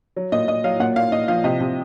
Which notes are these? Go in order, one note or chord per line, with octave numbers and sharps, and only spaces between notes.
F#3
A#2 D#5
A#2 D#5
F#3 F5
A#2 F#5
A#2 F5
A#2 D#5
F3 F5
C3 D#5
C3